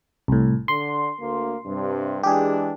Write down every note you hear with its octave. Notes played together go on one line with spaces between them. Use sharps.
C2 A2
D3 C6
D2 A#3
G2 C3
E3 G#3 D4 G4 G#4